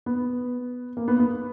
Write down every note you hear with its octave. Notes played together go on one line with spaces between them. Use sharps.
B3
A#3
B3
B3